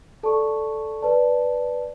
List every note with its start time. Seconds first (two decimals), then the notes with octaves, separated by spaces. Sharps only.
0.23 A4 D5 A5 C#6
1.02 B4 D5 A5